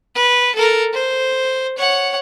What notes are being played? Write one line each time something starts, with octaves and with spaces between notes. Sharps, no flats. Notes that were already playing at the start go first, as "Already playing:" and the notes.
B4
A4 A#4
C5
C#5 F#5